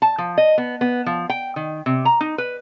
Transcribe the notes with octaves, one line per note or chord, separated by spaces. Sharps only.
A5
F3
D#5
B3
B3
F3
G5
D#3
C3
A#5
D#4
B4